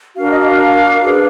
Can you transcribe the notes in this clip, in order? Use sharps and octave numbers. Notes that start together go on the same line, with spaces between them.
D4 F#4 A#4 F5
D#5
F5
D4 G#4 B4